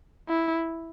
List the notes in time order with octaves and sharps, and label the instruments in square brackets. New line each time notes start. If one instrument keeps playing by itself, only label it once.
[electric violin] E4